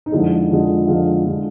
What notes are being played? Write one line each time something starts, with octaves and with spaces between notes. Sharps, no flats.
D#4
F2 D3 F3 G#3 E4
F2 D3 F3 G#3
F2 D3 F3 G#3 F4
F2 D3 F3 G#3